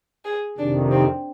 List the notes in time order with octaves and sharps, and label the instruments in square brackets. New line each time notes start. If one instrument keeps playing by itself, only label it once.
[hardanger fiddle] G#4
[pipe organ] F2 C3 D#3 [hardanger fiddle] D4
[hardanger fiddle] C4